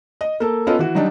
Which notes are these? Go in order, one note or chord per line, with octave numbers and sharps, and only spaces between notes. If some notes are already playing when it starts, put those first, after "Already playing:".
D#5
A#3 A4
B3 C#4 F4 A4 D#5
E3 F#4
F#3 G3 D4 D#4